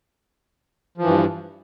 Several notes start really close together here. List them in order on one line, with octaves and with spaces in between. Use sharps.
F3 E3 G2